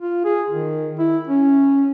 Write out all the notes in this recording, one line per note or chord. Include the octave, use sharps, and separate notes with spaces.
F4
G#4
D#3
E4
C#4